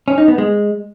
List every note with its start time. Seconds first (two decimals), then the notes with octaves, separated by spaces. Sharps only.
0.08 C#4
0.18 D#4
0.28 B3
0.38 G#3